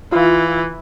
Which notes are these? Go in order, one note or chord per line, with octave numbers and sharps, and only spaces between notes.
E3 F4